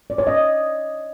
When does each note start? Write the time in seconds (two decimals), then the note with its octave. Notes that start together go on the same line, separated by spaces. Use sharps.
0.10 D5
0.18 C#5
0.27 D#5